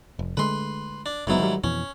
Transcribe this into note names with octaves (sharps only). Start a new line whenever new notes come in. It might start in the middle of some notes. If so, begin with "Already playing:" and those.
F1
D3 G#3 A3 B4 C6
D4
F#1 G#2 F#3 B3 E4
D#3 G3
F2 B2 E3 C#4